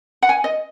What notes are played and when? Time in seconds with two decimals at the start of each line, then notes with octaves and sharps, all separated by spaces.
0.22 F#5
0.29 G#5
0.44 D#5